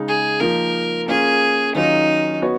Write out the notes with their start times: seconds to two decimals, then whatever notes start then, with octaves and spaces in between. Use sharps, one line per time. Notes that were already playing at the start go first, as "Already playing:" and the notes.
Already playing: C#3 G#3 D#4
0.08 G#4
0.40 F3 A#3 D#4 A#4
1.08 A#3 C#4 F4 G#4
1.75 D#3 F#3 C#4 D#4 F4
2.42 B3 F#4 C#5